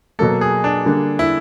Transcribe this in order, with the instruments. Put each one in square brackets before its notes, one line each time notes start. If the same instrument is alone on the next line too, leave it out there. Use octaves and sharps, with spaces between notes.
[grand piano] B2 F#3 A#3 [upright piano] A4
[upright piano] G#4
D4
[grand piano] D3 G3 A#3
[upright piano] E4